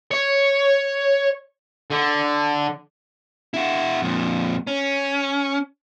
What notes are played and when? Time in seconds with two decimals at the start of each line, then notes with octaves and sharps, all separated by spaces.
0.11 C#5
1.91 D3
3.54 E4 F#4
4.02 F2 A#2
4.67 C#4